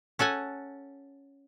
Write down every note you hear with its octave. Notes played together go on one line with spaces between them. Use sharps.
C#4 A4 F#5 G#5